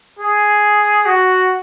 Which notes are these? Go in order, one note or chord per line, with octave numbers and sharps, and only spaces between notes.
G#4
F#4